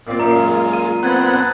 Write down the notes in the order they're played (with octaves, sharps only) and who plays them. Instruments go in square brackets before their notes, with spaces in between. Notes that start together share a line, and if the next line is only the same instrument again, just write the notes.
[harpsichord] A#2 C4 F4
[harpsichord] F#2 A#2 [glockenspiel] A#5
[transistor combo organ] G#3 F4
[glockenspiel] D#7
[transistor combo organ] B3 C4 F#5 [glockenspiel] F#6 G#6 A6
[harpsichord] A5 [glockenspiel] F#6